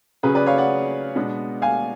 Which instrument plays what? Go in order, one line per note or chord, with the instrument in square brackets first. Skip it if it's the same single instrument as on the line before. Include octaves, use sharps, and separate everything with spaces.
[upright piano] C#3 F#3 C#4 G#4 B4
B4 D5
C#5 F5
D5 F#5
B2 G#3 B3 D4
F5 G#5